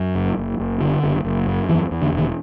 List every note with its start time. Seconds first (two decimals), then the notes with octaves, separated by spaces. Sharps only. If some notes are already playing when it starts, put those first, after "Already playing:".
Already playing: F#2
0.15 F#1
0.37 F#1
0.59 F#1
0.81 D3
1.03 F#1
1.24 F#1
1.47 F#2
1.69 E2 E3
1.91 E2
2.02 D3
2.12 E1
2.18 D#3